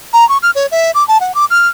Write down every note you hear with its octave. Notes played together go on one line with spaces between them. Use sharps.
A#5
C#6
F6
C#5
E5
D6
A5
F#5
D6
F6